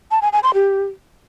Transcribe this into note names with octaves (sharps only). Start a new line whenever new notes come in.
A5
G#5
G#5
C6
G4